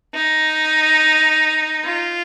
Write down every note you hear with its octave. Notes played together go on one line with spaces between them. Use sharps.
D#4
F4